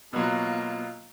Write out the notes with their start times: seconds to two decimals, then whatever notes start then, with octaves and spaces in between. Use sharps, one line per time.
0.13 B2 F#3 A#3 F4